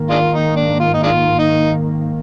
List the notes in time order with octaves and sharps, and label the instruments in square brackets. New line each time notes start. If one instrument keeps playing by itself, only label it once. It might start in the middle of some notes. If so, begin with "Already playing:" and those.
Already playing: [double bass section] G#2 D#3 A#3
[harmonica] G#3 D4 F4
D#4
D4
F4
D#4
G#3 D4 F4
D#4